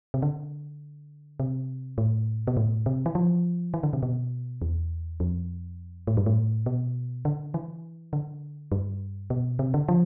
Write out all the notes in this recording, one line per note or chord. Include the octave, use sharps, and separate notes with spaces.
C3
D3
C3
A2
B2
A2
C3
E3
F3
E3
D3
C3
B2
E2
F2
A2
G2
A2
B2
D3
E3
D3
G2
B2
C3
D3
F3